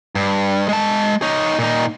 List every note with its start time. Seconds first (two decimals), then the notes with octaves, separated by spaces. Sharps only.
0.15 G2
0.69 G#3 A5
1.22 D#4 C#5
1.59 A#2 D#4